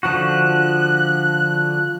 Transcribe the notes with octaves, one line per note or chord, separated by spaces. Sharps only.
D3 F3 F#4 F#6